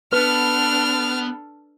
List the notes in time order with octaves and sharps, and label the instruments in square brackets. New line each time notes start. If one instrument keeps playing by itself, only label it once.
[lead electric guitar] B3 [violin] D4 A4 [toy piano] B4 [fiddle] F6